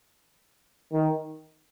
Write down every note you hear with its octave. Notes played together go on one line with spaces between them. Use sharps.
D#3